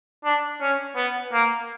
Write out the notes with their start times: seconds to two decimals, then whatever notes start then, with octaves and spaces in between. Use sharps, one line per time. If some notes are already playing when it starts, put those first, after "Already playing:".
0.24 D4
0.61 C#4
0.96 B3
1.33 A#3